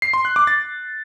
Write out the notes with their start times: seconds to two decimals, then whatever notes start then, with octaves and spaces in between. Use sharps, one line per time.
0.02 C7
0.13 C6
0.25 F#6
0.36 D6
0.47 A6